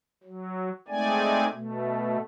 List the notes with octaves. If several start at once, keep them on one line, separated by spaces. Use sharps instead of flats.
F#3
G#3 A3 C4 D#4 D5 G#5
B2 A3